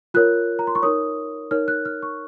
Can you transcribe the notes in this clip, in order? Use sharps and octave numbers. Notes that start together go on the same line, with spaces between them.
F4 A#4 C#5 F#6
A#5
C6
C#6
D#4 A#4 C#5 D#6
D#4 A#4 C#5 F6
F#6
F6
C#6